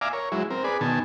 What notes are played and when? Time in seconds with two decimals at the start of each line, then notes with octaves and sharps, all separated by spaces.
0.01 D5 E5 F5 G#5 A#5 D6
0.13 A#4 C#5
0.32 F#3 G#3 E4
0.50 C4 A#4
0.64 G#4 B4 D5
0.81 B2 D#3 G#5 A5